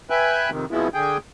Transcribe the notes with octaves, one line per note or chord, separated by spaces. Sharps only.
B4 E5 G5 G#5 F#6
F2 C3 D#3
F2 B2 F3 G#3 B3 E4
D3 G#4 G5